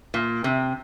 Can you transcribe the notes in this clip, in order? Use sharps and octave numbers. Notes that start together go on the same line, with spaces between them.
A#2
C3